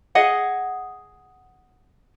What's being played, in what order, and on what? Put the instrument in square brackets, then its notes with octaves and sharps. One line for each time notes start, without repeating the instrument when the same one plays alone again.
[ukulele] G#4 D#5 F#5